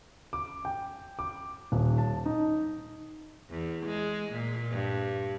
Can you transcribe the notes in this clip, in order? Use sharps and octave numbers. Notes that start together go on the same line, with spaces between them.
D6
G5
D6
D#1
A5
D#4
E2
G#3
A#2
G2